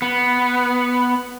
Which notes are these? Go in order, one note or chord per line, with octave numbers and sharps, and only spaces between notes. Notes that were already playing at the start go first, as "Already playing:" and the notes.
B3